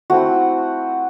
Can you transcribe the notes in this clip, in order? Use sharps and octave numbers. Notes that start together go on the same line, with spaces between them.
A3 C4 E4 F#4